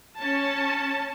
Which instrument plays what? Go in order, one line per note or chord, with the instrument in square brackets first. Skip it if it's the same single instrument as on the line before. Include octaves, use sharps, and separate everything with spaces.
[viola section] C#4 A5